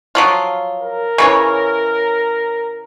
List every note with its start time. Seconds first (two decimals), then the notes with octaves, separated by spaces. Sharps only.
0.15 F3 F#3 F4
0.80 A#4
1.18 C#3 E3 C#5